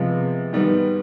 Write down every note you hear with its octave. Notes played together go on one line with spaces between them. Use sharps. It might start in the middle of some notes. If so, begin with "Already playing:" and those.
Already playing: C3 F3 G#3 B3
G#2 D#3 G3 B3